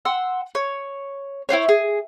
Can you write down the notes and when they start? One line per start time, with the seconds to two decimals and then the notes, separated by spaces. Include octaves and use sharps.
0.05 F#5 C6 E6
0.55 C#5
1.49 E4 F4 C5 C#5
1.69 G#4